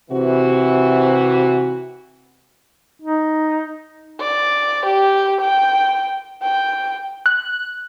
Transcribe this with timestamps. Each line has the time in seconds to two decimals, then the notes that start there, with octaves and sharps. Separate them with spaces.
0.11 C3 E3 F#4
3.02 D#4
4.21 D5
4.86 G4
5.41 G5
6.43 G5
7.26 F#6